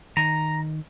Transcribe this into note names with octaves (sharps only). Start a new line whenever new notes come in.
D#3 A#5